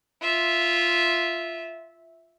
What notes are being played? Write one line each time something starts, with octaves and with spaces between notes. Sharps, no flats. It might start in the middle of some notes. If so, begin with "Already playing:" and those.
F4 E5